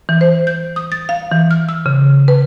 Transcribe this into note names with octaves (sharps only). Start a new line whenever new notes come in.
E3
C5
G6
D#6
A6
F5
E3
F6
E6
C#3
B4